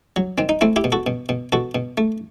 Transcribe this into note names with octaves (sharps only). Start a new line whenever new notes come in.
F#3
D#3 C4
D#4
A3 C4 E4
E4 G4
B2
F#4 A4
B2
B2
B2 F#4 A4
B2
A3